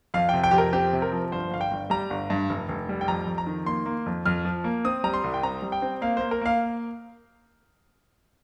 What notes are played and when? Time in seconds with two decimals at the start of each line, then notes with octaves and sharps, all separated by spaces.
0.14 F2 F5
0.29 C3 G5
0.44 G5
0.51 F2 G4
0.58 A#4
0.73 C4 G4
0.93 C3
1.02 A#4
1.12 F3
1.32 G1 C5
1.51 G1 F5
1.61 G5
1.71 G1
1.90 G3 A#5
2.10 G1
2.30 G2
2.49 F1
2.69 F1
2.89 G3
3.01 G5
3.08 F2 A#5
3.27 F2
3.38 A#5
3.47 D#3
3.66 A#3 C6
3.86 A#3
4.06 F2
4.26 F2 F6
4.45 F3
4.64 A#3
4.84 C4 D#6
5.04 G3 A#5
5.14 C6
5.24 C2
5.34 G5
5.43 C4 A#5
5.62 G3
5.72 G5
5.82 C4
6.02 A#3 F5
6.17 A#3 C5
6.31 A#4
6.41 A#3 F5